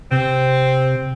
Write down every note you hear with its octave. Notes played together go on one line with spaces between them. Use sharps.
C3 C4